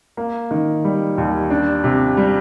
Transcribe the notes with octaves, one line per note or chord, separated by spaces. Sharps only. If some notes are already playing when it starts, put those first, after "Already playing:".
A#3
D#3
G3
D#2
D4
C3
G3